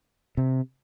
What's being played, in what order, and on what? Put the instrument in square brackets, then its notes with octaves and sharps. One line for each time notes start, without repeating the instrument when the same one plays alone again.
[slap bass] C3